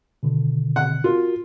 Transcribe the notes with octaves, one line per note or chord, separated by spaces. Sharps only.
B2 D3 D#3
F#5
F4 F#4 A#4